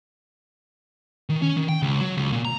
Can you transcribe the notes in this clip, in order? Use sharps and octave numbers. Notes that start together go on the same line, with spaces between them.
D#3
C#4
D#3
G5
C#2
F#3
C#2
A#2
A#5